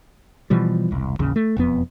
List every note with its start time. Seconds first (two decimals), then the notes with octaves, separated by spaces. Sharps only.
0.50 B2 E3 F3 G3
0.91 E1 C2
1.19 A1 D#2 C#3
1.36 A3
1.57 E1 F2 B3